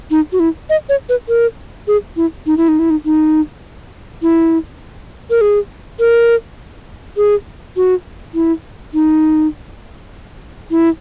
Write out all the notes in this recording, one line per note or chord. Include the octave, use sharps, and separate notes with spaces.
D#4
F#4
E4
D#5
C#5
B4
A#4
G#4
E4
D#4
E4
D#4
E4
D#4
D#4
E4
A#4
G#4
A#4
G#4
F#4
E4
D#4
E4